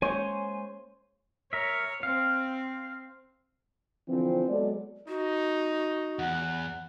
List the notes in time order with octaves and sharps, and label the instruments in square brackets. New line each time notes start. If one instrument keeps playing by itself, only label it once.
[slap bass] G#3 A#3 [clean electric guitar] C5 [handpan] C#5 [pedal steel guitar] G#5
[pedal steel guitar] A#4 E5 [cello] C#5
[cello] C4 [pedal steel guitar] F5
[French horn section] D3 E3 F3 C4
F#3 G#3 B3 A4 D5
[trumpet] D#4 [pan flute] F#4
[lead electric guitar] E2 [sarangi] F#5